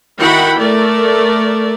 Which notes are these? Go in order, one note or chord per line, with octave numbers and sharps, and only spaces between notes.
D#3 E4 F#4 F#5 G5 B5
A3 A#4 D5